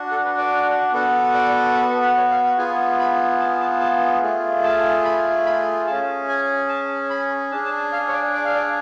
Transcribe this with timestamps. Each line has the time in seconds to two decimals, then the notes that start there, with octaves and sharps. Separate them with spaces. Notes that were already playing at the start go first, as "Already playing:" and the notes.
Already playing: D4 F#4
0.11 A4
0.25 B4
0.38 D5
0.93 B3 F#4 A4
1.34 D5
1.75 B4
1.89 A4
2.03 B4
2.17 C#5
2.31 F5
2.44 F#5
2.58 B3 F4 G#4 G#5
2.99 B5
3.40 A5
3.60 A5
3.80 A5
4.22 A3 F4 G#4
4.64 A5
5.04 B5
5.46 B5
5.86 C#4 G#4 A5
6.28 G#5
6.69 A5
7.10 B5
7.51 D4 A5
7.55 G#4
7.65 A5
7.92 F5
8.08 C#5
8.14 D5
8.34 D5
8.45 F5
8.55 D5